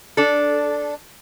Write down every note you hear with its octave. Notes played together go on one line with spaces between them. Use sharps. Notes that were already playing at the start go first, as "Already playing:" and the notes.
D4 A4